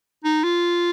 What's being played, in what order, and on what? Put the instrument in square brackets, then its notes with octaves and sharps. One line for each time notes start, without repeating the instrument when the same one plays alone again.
[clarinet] D#4
F4